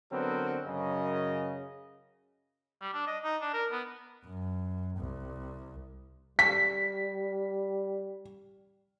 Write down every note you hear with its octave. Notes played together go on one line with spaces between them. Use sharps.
D3 F#3 B3 C4 F#4 A#4
F#2 C#3 D#5
G3
D4
D#5
D#4
D4
A#4
B3
F#2
C2
G3 B6